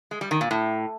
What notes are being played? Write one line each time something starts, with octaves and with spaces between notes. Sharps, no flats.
G#3
G3
D#3
A#2
A2